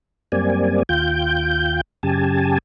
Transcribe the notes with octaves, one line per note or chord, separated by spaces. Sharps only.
F#2 G3 A#3 C4 D5 G#5
D#2 F4 G5 G6
F#2 C#3 G4 G#5 A5